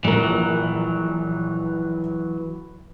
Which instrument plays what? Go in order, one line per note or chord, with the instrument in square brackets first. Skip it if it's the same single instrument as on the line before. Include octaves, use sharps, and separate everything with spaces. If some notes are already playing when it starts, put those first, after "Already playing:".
[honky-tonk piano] A#1 A#4 [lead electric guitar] E3 F#3